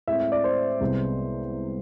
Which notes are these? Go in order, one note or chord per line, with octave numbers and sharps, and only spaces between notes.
A2 G#3 C4 E5
E5
D5
C5
C2 C3 G#3 B3